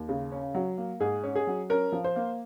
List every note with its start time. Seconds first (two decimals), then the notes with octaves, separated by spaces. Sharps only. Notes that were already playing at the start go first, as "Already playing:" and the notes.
Already playing: D#2
0.09 C#3
0.32 C#4
0.54 F#3
0.78 A#3
1.00 G#2 G#4
1.23 C#4
1.35 G#4
1.47 F#3
1.70 C#4 A#4
1.92 F3
2.04 C5
2.16 A#3